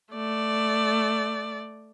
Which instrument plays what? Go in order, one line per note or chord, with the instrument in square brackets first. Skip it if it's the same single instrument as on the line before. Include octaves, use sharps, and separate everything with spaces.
[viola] A3 D5